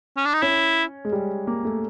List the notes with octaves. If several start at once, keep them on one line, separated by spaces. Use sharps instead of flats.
C#4
D4
D#4
C#4 E4
G#3
G3
A#3
A3